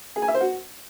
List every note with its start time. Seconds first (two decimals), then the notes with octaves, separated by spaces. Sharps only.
0.16 G#4
0.22 G#5
0.28 E5
0.34 C5
0.41 F#4